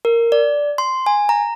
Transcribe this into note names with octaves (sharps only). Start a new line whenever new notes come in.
A#4
D5
C6
G#5
A#5